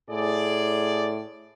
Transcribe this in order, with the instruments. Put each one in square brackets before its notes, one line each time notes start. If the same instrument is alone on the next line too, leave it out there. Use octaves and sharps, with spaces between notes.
[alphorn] A2 [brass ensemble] G#4 D5